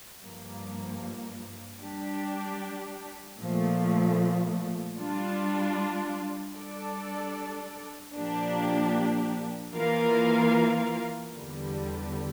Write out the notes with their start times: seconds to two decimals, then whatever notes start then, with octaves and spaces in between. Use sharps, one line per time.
0.23 G2 F3 A#3
1.82 G3 D4 G4
3.40 A#2 F3 A3
4.99 G3 D4 F4
6.56 G3 D4 A4 D5
8.15 A#2 F3 A#3 D4 G4
9.74 E3 A#3 F4 A#4 F5
11.32 E2 D3 G3